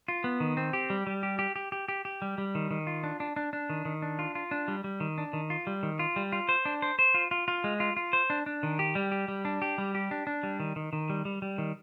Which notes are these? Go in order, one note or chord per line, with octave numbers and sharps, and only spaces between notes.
F4
B3
D#3
C4
G4
G3
G3
G4
G4
G4
G4
G4
G4
G3
G3
D#3
D#3
F4
D4
D4
D4
D4
D#3
D#3
D4
F4
F4
D4
G3
G3
D#3
D4
D#3
F4
G3
D#3
F4
G3
F4
C5
D4
C5
C5
F4
F4
F4
G#3
F4
F4
C5
D4
D4
D#3
G4
G3
G4
G3
D4
G4
G3
G4
D4
D4
G3
D#3
D#3
D#3
G3
G3
G3
D#3